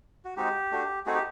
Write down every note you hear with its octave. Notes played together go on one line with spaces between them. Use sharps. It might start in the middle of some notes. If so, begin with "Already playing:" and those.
F#4
G#3 C4 D#4 F#4 G4
A3 D4 F#4
A3 C4 D#4 F#4 G#4
G4